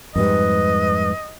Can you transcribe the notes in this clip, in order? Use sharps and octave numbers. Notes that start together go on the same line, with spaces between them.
F2 G#2 G3 B4 D#5